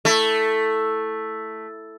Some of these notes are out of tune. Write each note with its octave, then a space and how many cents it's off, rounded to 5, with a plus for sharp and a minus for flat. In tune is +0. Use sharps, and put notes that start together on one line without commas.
A3 +0 E4 +0